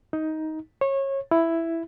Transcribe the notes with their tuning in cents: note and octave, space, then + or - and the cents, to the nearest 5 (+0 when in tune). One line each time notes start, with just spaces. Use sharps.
D#4 +15
C#5 -25
E4 +5